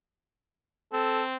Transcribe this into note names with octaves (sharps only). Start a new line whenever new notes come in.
C4 A4